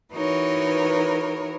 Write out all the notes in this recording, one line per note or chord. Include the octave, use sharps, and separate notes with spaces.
E3 D#4 F#4 A#4 B4 C#5